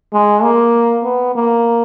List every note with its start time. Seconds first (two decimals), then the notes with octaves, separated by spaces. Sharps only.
0.13 G#3
0.43 A#3
1.04 B3
1.35 A#3